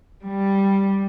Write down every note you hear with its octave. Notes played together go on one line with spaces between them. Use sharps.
G3